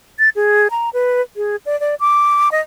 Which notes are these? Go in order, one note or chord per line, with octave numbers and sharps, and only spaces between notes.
A6
G#4
A#5
B4
G#4
D5
D5
D6
D#5